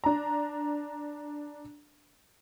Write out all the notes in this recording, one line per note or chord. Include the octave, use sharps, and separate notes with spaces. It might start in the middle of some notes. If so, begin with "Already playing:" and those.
D4 A#5